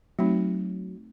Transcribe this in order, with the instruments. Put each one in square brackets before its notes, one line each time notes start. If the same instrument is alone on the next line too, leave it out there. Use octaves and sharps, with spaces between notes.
[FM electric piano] F#3 [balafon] A3 C4 D#4